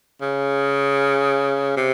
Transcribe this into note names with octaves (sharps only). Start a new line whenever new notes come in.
C#3
C3